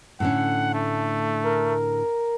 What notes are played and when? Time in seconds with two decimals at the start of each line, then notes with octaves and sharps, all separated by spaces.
0.20 A2 D3 C#4 F#5
0.74 A3
1.44 A#4